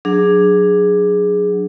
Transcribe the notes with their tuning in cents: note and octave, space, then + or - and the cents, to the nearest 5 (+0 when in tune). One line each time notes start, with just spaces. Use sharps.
F#3 +0 D4 +5 G#4 +0